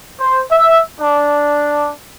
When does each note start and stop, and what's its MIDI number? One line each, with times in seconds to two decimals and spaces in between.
0.18 0.43 72
0.50 0.80 76
1.00 1.90 62